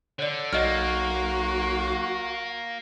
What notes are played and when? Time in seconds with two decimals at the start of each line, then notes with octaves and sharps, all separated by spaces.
0.19 D3 C#5 D5
0.53 B1 A#3 F#4 C#5 D#5 F6